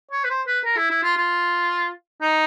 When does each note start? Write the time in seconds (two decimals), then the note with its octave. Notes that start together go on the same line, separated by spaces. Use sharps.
0.12 C#5
0.25 B4
0.30 C5
0.47 B4
0.65 A#4
0.77 E4
0.90 E4
1.03 F4
1.17 F4
2.21 D#4